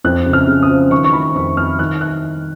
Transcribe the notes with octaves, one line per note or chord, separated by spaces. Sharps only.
F2 F#6
C#3
F6
C#3
D#6
F3
D#3 C#6
C#6
D#3 B5
F2 C#6
F2 F6
D#3 F#6
F#6